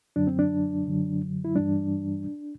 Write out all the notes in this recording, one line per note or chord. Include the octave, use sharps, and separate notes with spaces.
F#2 D3 F#3 D4
C4
D4
F#2 D3 F#3
E4
G2 E3 G3 D4